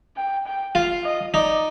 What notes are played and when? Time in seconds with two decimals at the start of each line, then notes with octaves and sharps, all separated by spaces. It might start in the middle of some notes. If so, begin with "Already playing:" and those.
0.16 G5
0.46 G5
0.75 F4 F5
1.04 D#5
1.34 D#4 D5